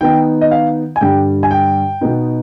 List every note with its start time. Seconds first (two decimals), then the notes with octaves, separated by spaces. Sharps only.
0.01 D#3 B3 D#4 G5
0.41 D#5
0.51 F5
0.96 G#5
1.01 G2 D3 G3 G5
1.43 G#5
1.51 G5
2.01 B2 B3 D#4